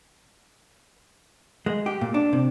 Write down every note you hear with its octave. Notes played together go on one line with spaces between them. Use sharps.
G#3
G4
A#2
D4
C3